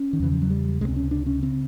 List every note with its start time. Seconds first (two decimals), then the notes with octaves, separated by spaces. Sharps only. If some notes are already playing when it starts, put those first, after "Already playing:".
Already playing: C#4
0.13 D#3
0.20 E2 C#3 E3
0.32 F3
0.42 F#3
0.50 G3
0.81 C#2 C3 G#3
0.88 C4
0.96 C#4
1.11 D4
1.26 C#4
1.42 C#3 C4